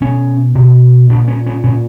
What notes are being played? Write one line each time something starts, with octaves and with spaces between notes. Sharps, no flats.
B2 C#4
B2
A#2 D4
C#4
C#4
A#2 C#4